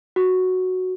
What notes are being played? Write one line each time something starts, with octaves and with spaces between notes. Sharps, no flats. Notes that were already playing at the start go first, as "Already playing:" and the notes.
F#4